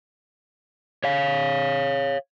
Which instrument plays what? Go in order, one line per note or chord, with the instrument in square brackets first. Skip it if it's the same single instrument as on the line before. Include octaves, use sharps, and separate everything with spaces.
[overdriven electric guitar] C#5 F5